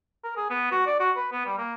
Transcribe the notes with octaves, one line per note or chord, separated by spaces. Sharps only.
A#4
G#4
B3
F#4
D5
F#4
B4
B3
G3
A#3